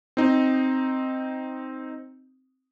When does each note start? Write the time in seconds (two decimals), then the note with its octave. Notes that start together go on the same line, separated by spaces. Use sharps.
0.17 C4 D#4